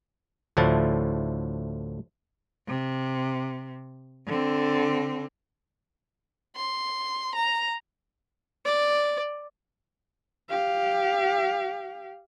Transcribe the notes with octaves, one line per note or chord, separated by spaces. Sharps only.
D2 A2 D3 F3 E4 A5
C3
D3 C4
C6
A#5
D5
G4 F5